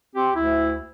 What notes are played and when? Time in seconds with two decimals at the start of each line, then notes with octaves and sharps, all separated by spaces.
0.15 C4 G4
0.35 D2 E4